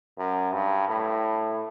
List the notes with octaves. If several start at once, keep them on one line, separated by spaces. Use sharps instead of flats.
F#2
G2
A2